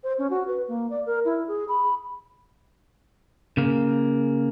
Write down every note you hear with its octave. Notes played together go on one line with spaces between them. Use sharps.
C5
C#4
F#4
B4
A#3
D5
A#4
E4
G#4
B5
C#3 A#3